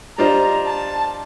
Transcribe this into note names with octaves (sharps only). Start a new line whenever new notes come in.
G3 D4 F4 C5 D#5 A#5
A5